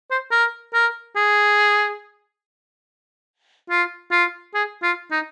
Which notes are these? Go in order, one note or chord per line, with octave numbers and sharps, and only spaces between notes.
C5
A#4
A#4
G#4
F4
F4
G#4
F4
D#4